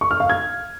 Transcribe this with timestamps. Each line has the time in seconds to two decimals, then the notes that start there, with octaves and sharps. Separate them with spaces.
0.01 C#6
0.11 F6
0.20 F5
0.30 G#6